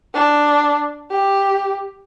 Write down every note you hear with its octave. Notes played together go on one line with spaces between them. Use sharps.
D4
G4